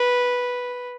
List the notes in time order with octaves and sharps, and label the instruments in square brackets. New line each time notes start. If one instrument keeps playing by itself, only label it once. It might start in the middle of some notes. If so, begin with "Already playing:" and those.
Already playing: [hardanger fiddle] B4